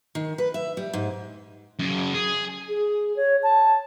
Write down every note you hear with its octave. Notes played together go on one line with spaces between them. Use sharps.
D#3
B4
E5
G3
G#2
F#2 C#3
G#4
G#4
C#5
A5